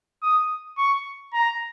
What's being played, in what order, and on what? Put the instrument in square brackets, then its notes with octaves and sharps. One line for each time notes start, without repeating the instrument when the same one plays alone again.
[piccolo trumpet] D#6
C#6
A#5